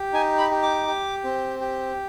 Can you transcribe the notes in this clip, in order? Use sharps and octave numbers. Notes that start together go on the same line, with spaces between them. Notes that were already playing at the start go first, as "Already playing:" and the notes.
Already playing: G4
D#4 G#5
B5
G4
D6
G4
C4
G4